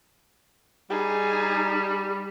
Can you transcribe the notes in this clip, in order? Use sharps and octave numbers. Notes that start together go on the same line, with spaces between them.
G3 D#4 G#4